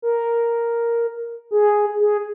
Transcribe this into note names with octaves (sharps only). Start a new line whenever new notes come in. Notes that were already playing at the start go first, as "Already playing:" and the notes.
A#4
G#4
G#4